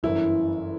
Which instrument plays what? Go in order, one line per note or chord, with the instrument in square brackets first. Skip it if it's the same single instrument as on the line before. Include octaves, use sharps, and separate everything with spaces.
[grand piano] G1 F#2 E3 [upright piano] E4